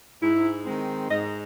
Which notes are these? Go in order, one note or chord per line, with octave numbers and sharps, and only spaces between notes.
G#2 E4
D#3 G#3 C4
G#2 D#5